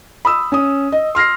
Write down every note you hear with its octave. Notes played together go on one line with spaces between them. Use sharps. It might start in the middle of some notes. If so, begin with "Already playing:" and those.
B5 D#6 E6
C#4 D#6
D#5
C6 F6 A#6 C7